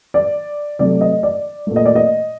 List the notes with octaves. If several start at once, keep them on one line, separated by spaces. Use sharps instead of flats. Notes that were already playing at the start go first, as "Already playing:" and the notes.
D5
C3 F#3 A3 D5
D#5
D5
A#2 A3
D#5
D5
D#5